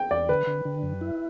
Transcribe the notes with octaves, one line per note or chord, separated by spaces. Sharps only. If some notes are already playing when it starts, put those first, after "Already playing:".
Already playing: G5
E2 D5
D3 B4
D3
D3
F#2
E4